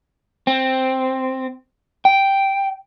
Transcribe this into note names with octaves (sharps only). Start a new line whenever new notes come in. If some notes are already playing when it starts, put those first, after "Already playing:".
C4
G5